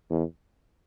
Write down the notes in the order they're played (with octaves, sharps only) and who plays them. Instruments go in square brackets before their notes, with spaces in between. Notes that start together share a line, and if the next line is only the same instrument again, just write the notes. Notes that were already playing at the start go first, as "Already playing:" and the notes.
[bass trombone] E2